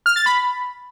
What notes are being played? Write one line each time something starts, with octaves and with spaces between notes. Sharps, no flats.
F6
A6
B5